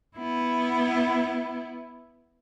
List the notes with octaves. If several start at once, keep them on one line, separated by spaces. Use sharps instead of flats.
B3 E4